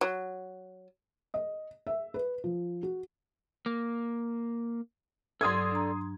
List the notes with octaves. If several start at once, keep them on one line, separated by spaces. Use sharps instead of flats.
F#3
D#5
E5
B4
F3
F#4
A#3
G2 F#3 A4 D5 C6 D#6 G#6
D4 A#5